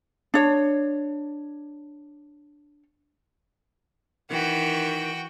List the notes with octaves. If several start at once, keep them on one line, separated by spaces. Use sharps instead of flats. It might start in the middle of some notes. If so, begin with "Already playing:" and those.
D4 C#5
D#3 E3 F#4 G5